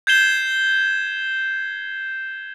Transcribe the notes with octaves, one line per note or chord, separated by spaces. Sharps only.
G6 G#6 C7 E7 G7